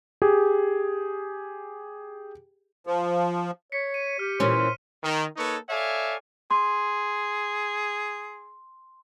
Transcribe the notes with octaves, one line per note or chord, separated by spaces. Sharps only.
G4 G#4
F3
C#5 B6 C#7
D#7
G4 F6
A#2 E3 C#4 C5
D#3
A#3 D#4 A4 B4 C#5
A4 C#5 D5 E5 F5 G#5
G#4 C6